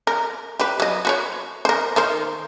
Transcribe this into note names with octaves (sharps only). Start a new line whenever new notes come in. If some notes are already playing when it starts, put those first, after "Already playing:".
A#4
G4 B4
F#3 D#5
F#4 B4 C#5
A#4 C5
D#3 A#4 C5